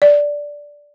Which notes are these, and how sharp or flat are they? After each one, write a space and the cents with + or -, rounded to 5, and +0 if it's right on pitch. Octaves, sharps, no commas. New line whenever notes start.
D5 -5